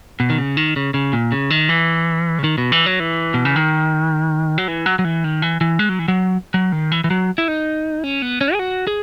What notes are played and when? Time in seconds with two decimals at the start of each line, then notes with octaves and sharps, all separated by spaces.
0.20 B2
0.30 D#3
0.38 C#3
0.57 D#3
0.76 C#3
0.94 C#3
1.13 A#2
1.32 C#3
1.50 D#3
1.69 E3
2.39 C#3
2.44 D#3
2.58 B2
2.72 E3
2.86 F#3
3.00 E3
3.34 B2
3.45 C#3
3.56 D#3
4.58 F#3
4.68 E3
4.86 F#3
4.99 F#3
5.04 E3
5.24 D#3
5.42 E3
5.61 E3
5.79 G#3
5.89 F#3
5.99 E3
6.08 F#3
6.54 F#3
6.72 D#3
6.92 E3
7.04 E3
7.10 F#3
7.38 E4
7.48 D#4
8.04 C#4
8.22 B3
8.41 C#4
8.53 G#4
8.59 F#4
8.87 G#4